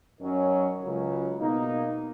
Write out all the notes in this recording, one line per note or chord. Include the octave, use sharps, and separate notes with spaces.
F#2 D#3 F#3 C#4
C#2 C#3 F#3
B2 A#3 D#4